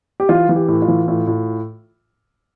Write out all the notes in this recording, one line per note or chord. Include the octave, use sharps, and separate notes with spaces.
G4
E3 F4
E3
G4
A2
F4
E3
A2
A2